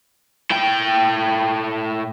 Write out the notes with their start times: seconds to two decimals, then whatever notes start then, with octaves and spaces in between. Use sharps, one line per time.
0.50 A2 G5